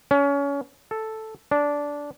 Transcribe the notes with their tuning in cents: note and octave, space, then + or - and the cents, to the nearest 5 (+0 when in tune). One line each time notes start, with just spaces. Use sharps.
C#4 +25
A4 +0
D4 -15